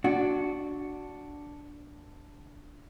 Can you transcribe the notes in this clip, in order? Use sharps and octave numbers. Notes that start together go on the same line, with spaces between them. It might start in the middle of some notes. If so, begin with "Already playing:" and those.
D4 F#4